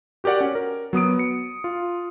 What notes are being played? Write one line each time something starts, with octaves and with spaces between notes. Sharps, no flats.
F#4 G4 A#4 D5 F#5
C#4
A#4
F#3 B3 D#6 D7
C#7
F4